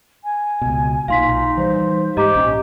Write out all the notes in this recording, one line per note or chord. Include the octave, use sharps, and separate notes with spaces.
G#5
C#2 B2
B1 A#2 D#4 F5 C6 B6
E3 G3 C5
G#2 G4 D#5 A#5
A#1 C#4